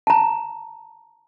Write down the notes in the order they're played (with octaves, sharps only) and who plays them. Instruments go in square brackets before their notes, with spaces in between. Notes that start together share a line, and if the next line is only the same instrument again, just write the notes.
[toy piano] A5 A#5